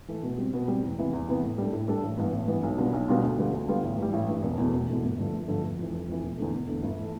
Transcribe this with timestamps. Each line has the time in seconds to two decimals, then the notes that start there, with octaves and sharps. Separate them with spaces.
0.08 E3 A3
0.23 B2
0.38 G3 C4
0.53 B2
0.68 G3 C4
0.83 E2
0.98 C3 E3 B3 E4
1.13 E2
1.28 C3 E3 B3 E4
1.43 A2
1.58 G3 D4 A4
1.73 A2
1.88 G3 D4 A4
2.03 A1
2.18 G2 E3 B3
2.33 A1
2.48 G2 E3 B3
2.63 B1
2.78 B2 G3 D4 F4
2.93 B1
3.08 B2 G3 D4 F4
3.23 D2
3.38 D3 G3 B3 F4
3.53 D2
3.68 D3 G3 B3 F4
3.83 A1
3.98 G2 E3 G3
4.13 A1
4.28 G2 E3 G3
4.43 E1
4.58 E2 B2 A3
4.73 E1
4.88 E2 B2 A3
5.03 G1
5.18 G2 D3 F3 A3
5.33 G1
5.48 G2 D3 F3 A3
5.63 F1
5.78 F2 E3
5.92 F1
6.08 F2 E3
6.23 E1
6.38 E2 D3 A3
6.53 E1
6.68 E2 D3 A3
6.83 G1
6.99 E3 A3